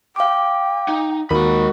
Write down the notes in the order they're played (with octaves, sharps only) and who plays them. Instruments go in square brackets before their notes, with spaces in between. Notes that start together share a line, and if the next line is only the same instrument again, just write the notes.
[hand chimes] F5 D6 [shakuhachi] G5
[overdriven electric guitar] D#4
[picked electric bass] D#2 [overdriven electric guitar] G#3 B5 [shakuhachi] F#4 [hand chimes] A#4